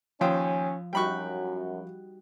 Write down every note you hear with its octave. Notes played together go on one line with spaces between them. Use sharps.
D#2 F3 C#4 C5 G5
F#2 G3 D#4 F#4 G5 B5 C#6